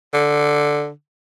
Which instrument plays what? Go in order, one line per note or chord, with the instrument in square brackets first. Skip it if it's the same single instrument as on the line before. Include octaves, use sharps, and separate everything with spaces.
[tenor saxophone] D3